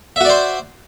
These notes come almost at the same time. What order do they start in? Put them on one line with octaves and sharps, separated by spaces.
E5 F#4 D5 C5